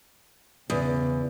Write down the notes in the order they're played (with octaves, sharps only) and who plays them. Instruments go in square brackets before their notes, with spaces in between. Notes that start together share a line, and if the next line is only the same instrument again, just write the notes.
[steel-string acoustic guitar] E2 [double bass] C#3